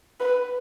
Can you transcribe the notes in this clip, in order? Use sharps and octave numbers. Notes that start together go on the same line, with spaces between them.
B4